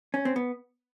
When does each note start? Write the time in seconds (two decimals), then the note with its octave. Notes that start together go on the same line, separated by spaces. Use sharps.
0.14 C#4
0.25 C4
0.36 B3